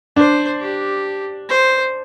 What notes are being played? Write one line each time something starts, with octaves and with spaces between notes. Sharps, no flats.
D4 C5
G4
C5